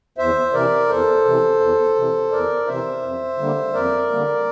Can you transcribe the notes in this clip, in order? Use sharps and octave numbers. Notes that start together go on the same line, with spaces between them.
E2 C5 E5
C3 E3 A#4 D5
E2 A4 C5
C3 E3
E2
C3 E3
E2 A#4 D5
C3 E3 C5 E5
F2
D3 G3 A#3
F2 A#4 D5
D3 G3 A#3